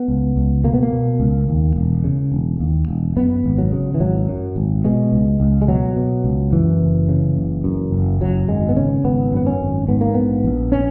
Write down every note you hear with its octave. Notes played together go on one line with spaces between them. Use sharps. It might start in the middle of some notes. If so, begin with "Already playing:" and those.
Already playing: B3
C#2
C#2
B2 A#3
B3
A#3
B2
C#2
D#2
E1
C#3
E1
D#2
E1
F#2 B3
G#1
F#3
C#3
E3
G#1 F#3
F#2
G#1
B2 G#3
C#2
C#2
G#3
B2 F#3
B2
C#2
F#2 E3
F#1
C#3
F#1
F#2
F#1
F#2 F#3
G#1 G#3
B3
C#3 C#4
G#1 B3
F#2 B3
C#4
G#1
G#2 B3
A#3
A#1 B3
A#1
C#4